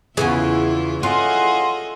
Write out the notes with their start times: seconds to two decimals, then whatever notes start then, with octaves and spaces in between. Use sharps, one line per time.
0.17 E2 C#3 E3 B3 E4 F4 G#4
1.03 C#4 F4 G#4 A4 D#5 F#5 C6